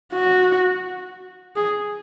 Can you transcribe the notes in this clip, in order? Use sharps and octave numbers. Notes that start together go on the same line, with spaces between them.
F#4
G#4